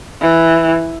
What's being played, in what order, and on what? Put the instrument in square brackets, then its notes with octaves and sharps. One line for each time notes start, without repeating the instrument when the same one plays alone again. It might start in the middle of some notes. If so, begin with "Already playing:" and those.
[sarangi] E3